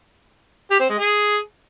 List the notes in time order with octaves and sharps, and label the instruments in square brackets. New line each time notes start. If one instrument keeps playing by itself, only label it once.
[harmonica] G4
C4
G#3
G#4